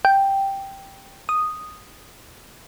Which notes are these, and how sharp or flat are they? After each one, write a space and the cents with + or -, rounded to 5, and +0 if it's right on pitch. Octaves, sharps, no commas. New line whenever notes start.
G5 +0
D#6 -5